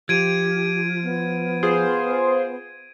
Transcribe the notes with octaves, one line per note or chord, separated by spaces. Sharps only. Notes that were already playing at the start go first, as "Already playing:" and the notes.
F3 G4 G#6 D7 D#7
B3
F4 G#4 C5